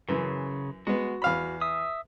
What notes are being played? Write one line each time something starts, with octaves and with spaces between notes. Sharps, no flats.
F#2 C#3 E3
G#3 B3 F#4
E2 F5 B5
E5 D#6